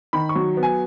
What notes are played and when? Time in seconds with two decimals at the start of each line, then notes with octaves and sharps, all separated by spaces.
0.13 D#3 B5
0.29 C#6
0.35 F#3
0.57 B3
0.63 G#5